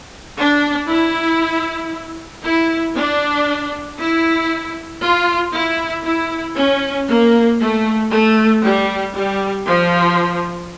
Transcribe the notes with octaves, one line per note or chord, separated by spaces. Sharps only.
D4
E4
E4
D4
E4
F4
E4
E4
C#4
A#3
A3
A3
G3
G3
F3